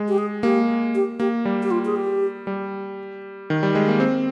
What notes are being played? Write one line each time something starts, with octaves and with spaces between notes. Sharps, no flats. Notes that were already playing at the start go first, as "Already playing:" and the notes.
Already playing: G#3
G4
G#4
A#3 G4
G4
A#3 G4
G3
G4
F4
G#4
G4
G3
D#3
G3
G#3
A#3
C4